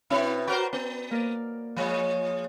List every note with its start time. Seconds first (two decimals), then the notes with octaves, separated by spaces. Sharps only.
0.10 B2 C4 C#4 E4 B4 G5
0.47 F#4 A#4 C5 D5
0.73 B3
1.11 A#3 A#4 D5
1.76 F3 G#3 C#5 F5